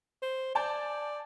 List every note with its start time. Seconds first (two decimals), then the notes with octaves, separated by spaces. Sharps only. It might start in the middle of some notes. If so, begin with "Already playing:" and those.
0.22 C5
0.55 D5 G#5 A5 G6